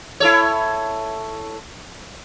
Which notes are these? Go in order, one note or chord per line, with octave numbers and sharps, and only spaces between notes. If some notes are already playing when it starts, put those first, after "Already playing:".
E4 A4 C#5